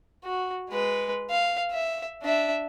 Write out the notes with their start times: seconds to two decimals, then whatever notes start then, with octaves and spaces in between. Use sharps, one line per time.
0.24 F#4
0.70 G#3 B4
1.30 F5
1.71 E5
2.23 D4 E5